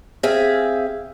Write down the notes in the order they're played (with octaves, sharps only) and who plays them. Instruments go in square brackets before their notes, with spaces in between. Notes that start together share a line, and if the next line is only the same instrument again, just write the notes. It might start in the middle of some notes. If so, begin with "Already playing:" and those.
[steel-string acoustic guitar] C4 G#4 E5 F5 G#5